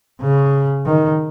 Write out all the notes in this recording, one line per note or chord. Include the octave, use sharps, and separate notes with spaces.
C#3
D#3